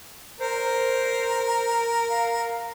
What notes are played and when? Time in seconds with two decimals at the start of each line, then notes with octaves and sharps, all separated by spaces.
0.40 A#4 C5
2.10 F5